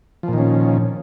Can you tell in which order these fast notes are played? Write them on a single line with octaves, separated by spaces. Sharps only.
F3 A#2 D#3 C#4